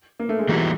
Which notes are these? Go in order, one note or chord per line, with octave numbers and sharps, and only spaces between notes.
A#3
A3
G#3
E3 G3 B3 D#4 F#4